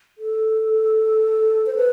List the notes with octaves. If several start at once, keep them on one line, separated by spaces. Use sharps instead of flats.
A4
C5
B4